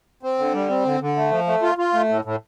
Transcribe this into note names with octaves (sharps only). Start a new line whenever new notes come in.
C4
D3
G3
C4
D3
D3
A3
F3
A3
F4
F4
A3
A2
A2